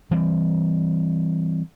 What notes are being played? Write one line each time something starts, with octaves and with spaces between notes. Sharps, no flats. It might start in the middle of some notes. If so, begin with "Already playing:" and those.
E3 G3 C4